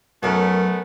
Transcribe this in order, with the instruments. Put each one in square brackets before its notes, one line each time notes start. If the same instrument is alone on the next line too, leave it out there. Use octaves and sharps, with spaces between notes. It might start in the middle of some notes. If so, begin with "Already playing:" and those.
[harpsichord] F#2 [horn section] A3 B3 [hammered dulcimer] C#4 A#4